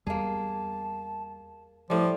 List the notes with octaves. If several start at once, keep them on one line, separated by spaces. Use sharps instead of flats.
E2 G3 A#3 G#4 A5
A2 F3 G3 D6